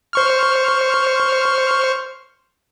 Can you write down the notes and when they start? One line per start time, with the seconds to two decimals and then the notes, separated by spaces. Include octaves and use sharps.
0.13 C5 C#6 F6